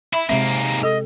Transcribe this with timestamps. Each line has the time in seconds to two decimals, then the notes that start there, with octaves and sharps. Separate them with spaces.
0.13 E4 E5 B5
0.29 G#2 C3 G#3 A#3 C4 E5
0.83 A4 D#5